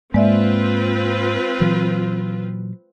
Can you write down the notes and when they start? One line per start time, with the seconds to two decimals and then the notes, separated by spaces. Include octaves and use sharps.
0.14 G#2 G#3 A#3 C4 F4 B4 D5 E5
1.60 A#2 E3 F#3